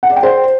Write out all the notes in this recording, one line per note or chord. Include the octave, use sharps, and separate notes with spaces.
F#5
D5
G5
C5